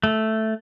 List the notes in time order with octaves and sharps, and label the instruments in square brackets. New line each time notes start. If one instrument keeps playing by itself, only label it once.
[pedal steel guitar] A3